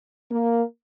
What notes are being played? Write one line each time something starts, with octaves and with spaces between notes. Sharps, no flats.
A#3